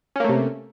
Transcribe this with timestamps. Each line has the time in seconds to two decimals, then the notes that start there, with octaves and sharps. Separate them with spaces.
0.16 C#4
0.20 A#3
0.24 A3
0.29 C3